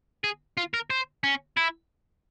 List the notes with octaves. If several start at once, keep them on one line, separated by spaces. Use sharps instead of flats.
G#4
F4
A#4
C5
C#4
E4